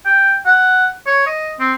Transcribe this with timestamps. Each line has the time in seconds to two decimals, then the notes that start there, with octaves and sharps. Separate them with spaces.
0.06 G5
0.46 F#5
1.07 C#5
1.27 D#5
1.59 C4